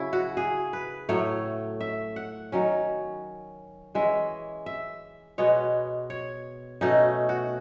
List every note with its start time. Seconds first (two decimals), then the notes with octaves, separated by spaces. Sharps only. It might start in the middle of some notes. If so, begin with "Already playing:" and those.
Already playing: C#3 F#3 C#4 E4
0.13 F#4
0.37 G#4
0.73 B4
1.09 A2 F#3 A3 C#5
1.81 E5
2.16 F#5
2.52 D#3 F#3 C#4
3.95 E3 G#3 C#4 E5
4.66 E5
5.38 B2 G#3 B3 C#5
6.10 C#5
6.81 B2 A3 C#4 D#4
7.29 F#4